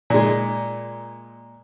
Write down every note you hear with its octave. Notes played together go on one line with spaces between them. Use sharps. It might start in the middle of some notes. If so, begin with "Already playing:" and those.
A#2 G#3